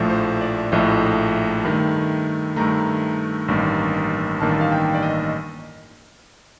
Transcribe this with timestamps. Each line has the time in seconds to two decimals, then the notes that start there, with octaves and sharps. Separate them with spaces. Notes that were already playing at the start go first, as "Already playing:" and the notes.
Already playing: A#1 A2 F3 A3
0.10 C5
0.41 D5
0.72 A#1 A2 F3 A3 D#5
1.65 G2 D#3 A3
2.56 G2 D#3 A3 A#5
3.48 A1 G2 D#3 A#3
4.40 A1 G2 D#3 A#3 A5
4.61 F5
4.72 G5
4.95 D5
5.02 D#5